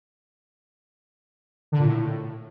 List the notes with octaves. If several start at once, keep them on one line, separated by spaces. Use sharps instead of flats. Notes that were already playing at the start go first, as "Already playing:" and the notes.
D3
A#2
A2